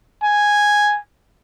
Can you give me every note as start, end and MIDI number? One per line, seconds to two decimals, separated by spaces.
0.23 0.99 80